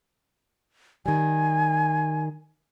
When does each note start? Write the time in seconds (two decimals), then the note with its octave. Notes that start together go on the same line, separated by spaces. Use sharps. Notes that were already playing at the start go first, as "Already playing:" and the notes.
1.06 D#3 G3 G#5